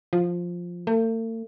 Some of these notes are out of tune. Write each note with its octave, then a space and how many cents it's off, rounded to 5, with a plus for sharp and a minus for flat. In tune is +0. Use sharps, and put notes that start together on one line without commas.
F3 +5
A3 +45